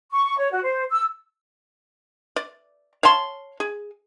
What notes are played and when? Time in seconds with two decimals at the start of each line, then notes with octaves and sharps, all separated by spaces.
0.12 C#6
0.37 C#5
0.51 F#4
0.63 C5
0.89 E6
2.36 D5
3.03 C#5 F5 A5 C6
3.60 G#4